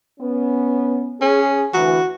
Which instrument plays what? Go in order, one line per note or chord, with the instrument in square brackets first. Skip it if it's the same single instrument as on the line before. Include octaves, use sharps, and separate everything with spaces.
[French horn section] B3 C#4
[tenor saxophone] C#4 [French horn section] G#4
[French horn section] D2 E3 [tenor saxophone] F#4